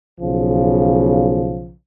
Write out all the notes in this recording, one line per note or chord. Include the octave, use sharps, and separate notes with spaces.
B1 C#3 F3